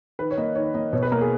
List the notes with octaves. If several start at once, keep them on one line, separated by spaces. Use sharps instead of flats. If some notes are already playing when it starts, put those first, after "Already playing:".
D#3 B4
C#5
A#3 D#5
D#3 C#5
A#3 D#5
B2 C#5
B4
A#3 A#4
G#4